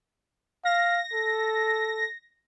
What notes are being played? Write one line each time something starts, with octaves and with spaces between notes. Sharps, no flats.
F5 A#6
A4